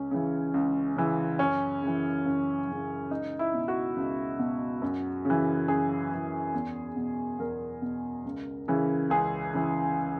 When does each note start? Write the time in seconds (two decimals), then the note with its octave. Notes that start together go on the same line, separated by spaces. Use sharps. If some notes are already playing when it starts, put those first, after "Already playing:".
Already playing: C#2 C#4
0.11 C#3 E3
0.54 C#2
0.96 C#3 E3
1.39 F#2 C#4
1.82 C#3
1.87 E3
2.26 F#2
2.67 C#3 E3
3.10 C#2 D#4
3.39 E4
3.54 B2
3.68 F#4
3.96 C#2
4.39 B2
4.82 F#2
5.25 C#3 E3
5.68 F#2 G#4
6.11 C#3 E3
6.54 E2
6.96 B2
7.39 E2 A#4
7.82 B2
8.25 C#2
8.68 C#3 E3
9.10 C#2 G#4
9.54 C#3 E3